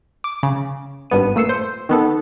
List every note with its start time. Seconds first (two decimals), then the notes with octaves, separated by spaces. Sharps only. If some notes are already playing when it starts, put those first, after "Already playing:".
0.24 D6
0.43 C#3
1.10 G#1 G2 B3 D#7
1.36 A#2 A3 E6 C7 C#7
1.49 C5
1.89 D#3 B3 A4